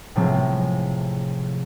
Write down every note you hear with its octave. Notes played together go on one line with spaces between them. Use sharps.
A2 C3 F3 G#3